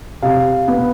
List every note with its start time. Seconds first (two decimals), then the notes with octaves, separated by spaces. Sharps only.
0.22 C3 F5
0.68 B3